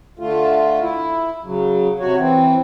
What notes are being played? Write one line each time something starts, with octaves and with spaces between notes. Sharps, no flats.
D3 A3 F4
E4
C#3 F#3
C3 F#4 C#5
E3 C4